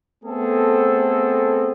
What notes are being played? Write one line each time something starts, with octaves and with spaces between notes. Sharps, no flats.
A3 B3 C4 G#4 A4